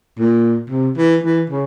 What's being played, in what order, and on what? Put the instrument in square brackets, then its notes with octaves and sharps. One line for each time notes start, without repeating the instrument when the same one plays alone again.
[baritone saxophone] A#2
C3
E3
E3
C#3